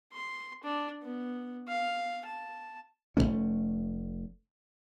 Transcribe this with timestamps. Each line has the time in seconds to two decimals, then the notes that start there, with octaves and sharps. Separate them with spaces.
0.13 C6
0.63 D4
1.02 B3
1.68 F5
2.25 A5
3.17 F1 G#2 A3 C#4